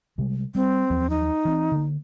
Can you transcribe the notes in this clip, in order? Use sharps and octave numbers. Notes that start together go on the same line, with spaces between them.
C3 G3 G#3
G3 C4
D#2 F3 F#3
D#4
E3 C4
D3 A#3